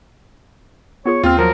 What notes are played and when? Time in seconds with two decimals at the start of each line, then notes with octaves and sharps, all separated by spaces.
1.06 B3 F4 G#4 C#5
1.23 D#2 C4 F4 F6
1.39 F3 F#3 A#4